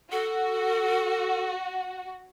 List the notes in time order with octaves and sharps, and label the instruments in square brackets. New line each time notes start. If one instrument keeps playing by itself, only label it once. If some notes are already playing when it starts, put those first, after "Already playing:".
[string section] F#4 [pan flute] A4